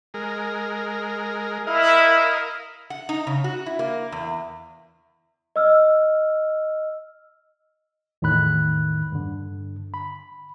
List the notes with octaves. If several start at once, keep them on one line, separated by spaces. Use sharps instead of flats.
G#3 A#4
E4 A#4 D#5 F5
F#5
D#4
C#3
F#4
E4
A#3
E2
D#5 E6 F6
E2 A2 D#3 B5 F#6
G2 D3
B5